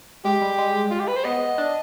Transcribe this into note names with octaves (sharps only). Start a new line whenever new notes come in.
G#3 G4
G3
G#3
F4
G4
B4
C5
B3 D#5
D4